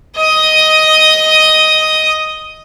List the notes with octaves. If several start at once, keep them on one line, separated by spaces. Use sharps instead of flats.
D#5 D#6